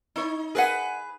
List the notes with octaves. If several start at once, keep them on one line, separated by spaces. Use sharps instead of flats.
D#4 E4 C#5
G#4 A#4 B4 D#5 F#5